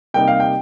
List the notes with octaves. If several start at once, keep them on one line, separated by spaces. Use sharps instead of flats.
C3 G3 A#3 D#4 G5
F5
G5